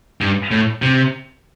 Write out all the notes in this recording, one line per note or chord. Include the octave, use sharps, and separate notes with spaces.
G2
A2
C3